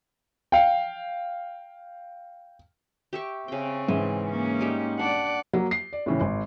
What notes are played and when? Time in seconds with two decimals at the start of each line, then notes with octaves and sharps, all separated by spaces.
0.52 F5 G5
3.13 G4 E5 C#6
3.48 C#3 C4 G5
3.88 G#2 E3
4.30 A#3 C#4
4.59 G3 D#4 G4
4.99 D4 D5 F#5
5.53 F#3 A#3
5.71 C7
5.93 D5
6.06 A2 C#3 E3
6.21 G#1